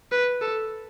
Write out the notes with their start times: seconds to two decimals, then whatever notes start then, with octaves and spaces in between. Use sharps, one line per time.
0.12 B4
0.41 A4